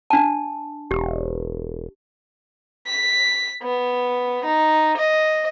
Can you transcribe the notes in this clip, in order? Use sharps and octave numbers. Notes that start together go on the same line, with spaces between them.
D4 A5
E1 G4
B6
B3
D#4
D#5